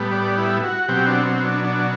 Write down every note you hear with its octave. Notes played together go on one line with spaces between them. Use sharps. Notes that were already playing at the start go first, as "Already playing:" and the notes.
Already playing: A2 G3 B3
D5
E4
F#4
B2 F#3 C4 G4
D4
C4
D4
D4